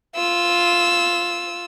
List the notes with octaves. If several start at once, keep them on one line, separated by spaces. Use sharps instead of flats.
F4 E6